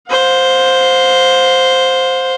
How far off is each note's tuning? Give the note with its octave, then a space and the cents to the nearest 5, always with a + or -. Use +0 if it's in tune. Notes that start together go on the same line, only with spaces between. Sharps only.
C5 +0 F5 +40